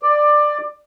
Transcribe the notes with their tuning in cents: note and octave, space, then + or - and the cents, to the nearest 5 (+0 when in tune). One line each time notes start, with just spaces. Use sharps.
D5 +15